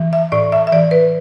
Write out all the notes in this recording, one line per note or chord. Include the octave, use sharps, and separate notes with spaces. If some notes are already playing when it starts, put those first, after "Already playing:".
Already playing: E3
E5
A2 D5
E5
E5
E3 D5
B4